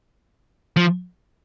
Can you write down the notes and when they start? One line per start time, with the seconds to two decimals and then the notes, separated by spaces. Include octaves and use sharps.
0.76 F3